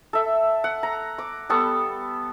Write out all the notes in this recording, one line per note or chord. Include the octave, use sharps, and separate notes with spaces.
A4 E5
F#5
A#5
D6
G3 B3 A4 C#6